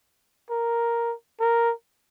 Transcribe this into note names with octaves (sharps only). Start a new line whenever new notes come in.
A#4
A#4